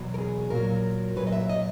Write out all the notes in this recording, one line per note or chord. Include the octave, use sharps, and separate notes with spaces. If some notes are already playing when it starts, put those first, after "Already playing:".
Already playing: E2 B2 F#3
A#4
G#4
A#2 F#3 A#4
A#2 F#3 B4
D#5
E5
D#5